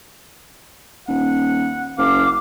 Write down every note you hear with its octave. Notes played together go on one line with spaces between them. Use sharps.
D#1 F#5
F#1 F5 D6